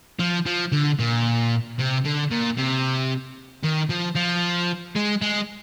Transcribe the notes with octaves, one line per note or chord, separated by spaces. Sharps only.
F3
F3
D3
A#2
C3
D3
A#2
C3
D#3
F3
F3
G#3
G#3